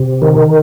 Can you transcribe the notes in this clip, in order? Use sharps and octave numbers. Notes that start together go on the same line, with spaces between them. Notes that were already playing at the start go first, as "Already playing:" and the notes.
Already playing: C3
D#3